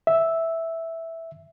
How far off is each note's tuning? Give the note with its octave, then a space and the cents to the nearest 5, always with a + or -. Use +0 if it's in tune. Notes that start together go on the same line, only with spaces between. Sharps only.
E5 -5